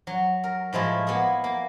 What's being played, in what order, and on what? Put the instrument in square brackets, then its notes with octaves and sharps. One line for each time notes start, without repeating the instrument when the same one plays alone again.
[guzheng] F#3
A#4
A2 F3 G#3 E4
A#3 B3 E4 G#4
A#3